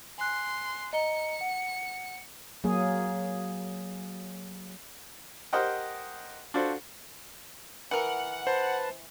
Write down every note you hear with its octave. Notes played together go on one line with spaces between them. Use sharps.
G#5 C6 F#6
D#5 A#5 C#7 G7
F#5
F#3 A#3 G#4
G4 A#4 C5 D#5 F#5 G5
D4 F4 F#4 A4 C5
E3 A#4 F#5
B4 C5 A5